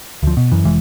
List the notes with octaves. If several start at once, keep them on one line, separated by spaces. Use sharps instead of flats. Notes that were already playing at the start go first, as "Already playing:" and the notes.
D2 F3
B2
F#2 E3
F1 E3 G#3